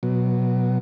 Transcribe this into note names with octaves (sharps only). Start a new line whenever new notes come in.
B2 F#3